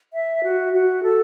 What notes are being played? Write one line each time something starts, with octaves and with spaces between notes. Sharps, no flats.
E5
F#4
F#4
A4